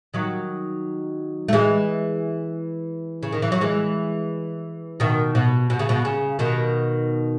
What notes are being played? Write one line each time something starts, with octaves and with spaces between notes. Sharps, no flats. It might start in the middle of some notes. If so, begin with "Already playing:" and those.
D#3 F#3
A3
E3 G#3
C#3
D#3
E3
F#3
E3 G#3
B2 D#3
B2
B2
C#3
B2
C#3
B2 D#3